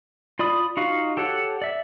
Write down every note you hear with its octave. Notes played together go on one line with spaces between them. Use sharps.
F4 D5 B5 D#6
D#4 F4 F#4 F5
G4 A4 C#5 F#5
D5 E5